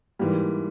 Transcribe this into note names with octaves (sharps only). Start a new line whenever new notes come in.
G#2 E3 G3 A#3